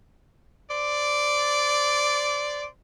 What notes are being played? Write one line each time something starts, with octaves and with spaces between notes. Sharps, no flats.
C5 D5